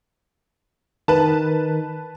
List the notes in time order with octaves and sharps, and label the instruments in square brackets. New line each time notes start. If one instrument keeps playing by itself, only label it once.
[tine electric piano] D#3 [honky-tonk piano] B4 A5